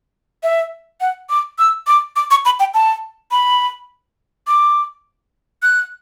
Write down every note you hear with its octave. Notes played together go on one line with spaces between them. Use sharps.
E5
F#5
D6
E6
D6
D6
C#6
B5
G5
A5
B5
D6
F#6